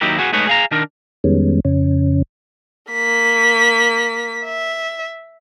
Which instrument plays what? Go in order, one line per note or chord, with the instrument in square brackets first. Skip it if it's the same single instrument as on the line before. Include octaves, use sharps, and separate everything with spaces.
[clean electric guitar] D#2 F#3 D#4 E4 G4 A#4
B3 F#4 G#4
G#3 A3 D#4 G#4 B4 C#5
G#4 F5 A#5
D#3 D4 A#4
[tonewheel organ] F2 D#3 G3 G#3 B3 C#4
F2 C#3 C#4
[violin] A#3 B6
E5